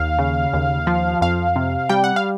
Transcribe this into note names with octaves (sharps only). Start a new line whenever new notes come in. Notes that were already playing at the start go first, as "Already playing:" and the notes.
Already playing: D#2 F5
C#3
D#2
F3
F2 F5
C3
G3 G5
F#5
F5